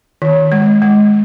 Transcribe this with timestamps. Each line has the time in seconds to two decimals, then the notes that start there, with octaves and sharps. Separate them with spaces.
0.22 D#3
0.52 G#3
0.82 G#3